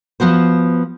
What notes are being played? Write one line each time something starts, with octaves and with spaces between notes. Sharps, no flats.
F3 B3 F#4 C5